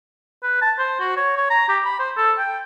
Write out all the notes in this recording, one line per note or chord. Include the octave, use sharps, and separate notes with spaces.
B4
A5
C5
F#4
C#5
C#5
A#5
G4
B5
C5
A4
G5